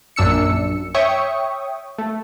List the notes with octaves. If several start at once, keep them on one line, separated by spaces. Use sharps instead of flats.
A#1 F#2 D4 E6 C#7
C#5 E5 G5 C#6 D#6
A3